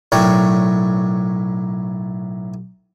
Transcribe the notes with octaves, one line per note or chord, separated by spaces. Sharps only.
B1 A2 A#4 C#5 D5 G5